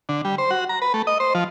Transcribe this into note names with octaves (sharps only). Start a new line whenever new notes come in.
D3
G3
C5
F#4
A#5
B4
A3
D#5
C5
F3